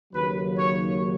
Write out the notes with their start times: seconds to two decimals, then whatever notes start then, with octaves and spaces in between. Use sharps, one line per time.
0.14 D#2 C#3 F#3 B4
0.58 C#5